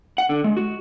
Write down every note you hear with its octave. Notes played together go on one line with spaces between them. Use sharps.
F#5
D3
G#3
F#4